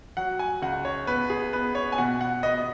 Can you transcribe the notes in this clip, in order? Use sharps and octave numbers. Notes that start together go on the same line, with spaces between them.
F#3 F#5
G#5
C#2 F#5
C#5
B3 B4
G#4
B3 B4
C#5
G#5
B2 F#5
F#5
B3 D#5
D#5